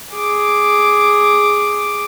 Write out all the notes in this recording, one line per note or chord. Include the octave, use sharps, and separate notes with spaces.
G#4 D6